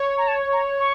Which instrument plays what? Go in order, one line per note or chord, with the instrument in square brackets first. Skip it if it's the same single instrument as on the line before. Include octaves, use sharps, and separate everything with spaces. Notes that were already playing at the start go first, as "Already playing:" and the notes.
Already playing: [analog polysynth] C#5
[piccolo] A#5
A5
A#5
C#6